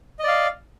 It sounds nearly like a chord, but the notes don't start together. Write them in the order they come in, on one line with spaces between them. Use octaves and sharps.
D#5 D5 F5